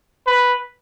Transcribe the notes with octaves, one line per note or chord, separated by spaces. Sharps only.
B4